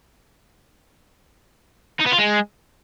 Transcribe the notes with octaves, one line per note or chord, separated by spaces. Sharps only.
D#4
B3
F4
G#3